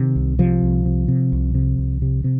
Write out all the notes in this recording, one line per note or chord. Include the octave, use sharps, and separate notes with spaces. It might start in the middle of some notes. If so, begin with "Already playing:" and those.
Already playing: C3 D#3
C2
C3 F3
C2
C3
C3
C2
C3
C2
C3
C3